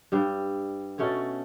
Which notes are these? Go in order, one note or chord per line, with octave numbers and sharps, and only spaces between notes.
G2 G3
B2 A3 C#4 C#5